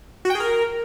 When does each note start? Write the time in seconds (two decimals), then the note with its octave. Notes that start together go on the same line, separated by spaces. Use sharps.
0.25 F#4
0.30 G5
0.35 G#4
0.40 A#4